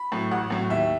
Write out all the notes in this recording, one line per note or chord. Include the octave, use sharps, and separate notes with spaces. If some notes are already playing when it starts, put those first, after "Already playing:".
Already playing: B5
A2 F#3
A1 F#5
A2 F#3
D#2 E5